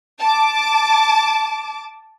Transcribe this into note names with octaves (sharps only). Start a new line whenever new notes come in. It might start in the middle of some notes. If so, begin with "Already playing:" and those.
A5 D6